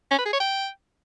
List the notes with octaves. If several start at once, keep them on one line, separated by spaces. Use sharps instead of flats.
C#4
B4
G#4
C#5
G5